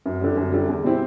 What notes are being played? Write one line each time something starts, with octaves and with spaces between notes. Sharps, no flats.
F#2
D3 G3
F#2
D3 G3
E2
B2 G3 C4 E4